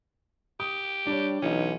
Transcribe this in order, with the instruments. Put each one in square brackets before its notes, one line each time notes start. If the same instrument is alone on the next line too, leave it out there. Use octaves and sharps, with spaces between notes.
[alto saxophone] G4 [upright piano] D#6
[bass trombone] G3 [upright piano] D4 C#5
[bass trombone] B1 [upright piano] E3 D#4 [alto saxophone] C#4